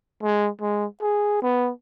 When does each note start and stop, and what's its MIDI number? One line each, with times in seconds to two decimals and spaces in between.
0.23 0.50 56
0.61 0.86 56
1.02 1.38 68
1.42 1.71 59